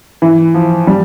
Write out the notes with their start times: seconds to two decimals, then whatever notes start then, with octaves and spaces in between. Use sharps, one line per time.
0.22 E3
0.54 F3
0.87 G3